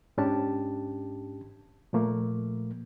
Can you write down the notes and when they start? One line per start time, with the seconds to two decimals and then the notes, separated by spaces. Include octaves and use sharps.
0.18 G#2 C#4 D4 G4 A5
1.93 A#2 F3 A3 A#3